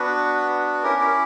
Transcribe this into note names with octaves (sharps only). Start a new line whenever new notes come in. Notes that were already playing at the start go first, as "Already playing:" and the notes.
Already playing: B3 D4 F#4 B4
C#4 E4 G4 A#4
A#4